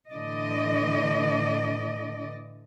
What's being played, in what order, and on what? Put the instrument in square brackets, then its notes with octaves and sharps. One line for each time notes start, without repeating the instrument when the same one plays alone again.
[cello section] A2 D3 E3 D5 D#5